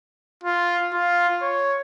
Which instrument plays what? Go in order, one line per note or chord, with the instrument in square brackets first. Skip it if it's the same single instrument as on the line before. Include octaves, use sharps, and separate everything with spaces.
[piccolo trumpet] F4
F4
C#5